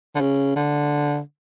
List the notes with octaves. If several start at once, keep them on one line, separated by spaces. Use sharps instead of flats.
D3
C#3
D3